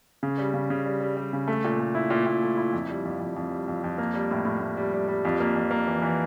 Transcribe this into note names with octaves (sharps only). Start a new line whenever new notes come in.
C#3
G3
C#3
C#3
G3
G3
G3
C#3
A3
A#2
A3
E4
A#2
A#2
A3
E4
F2
G3
F2
F2
F2
G3
F2
F2
A#3
G3
A2
A2
A2
G3
G3
G3
F2
A#3
F2
A#3
E3
E3